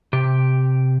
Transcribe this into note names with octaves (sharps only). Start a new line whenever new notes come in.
C3 G4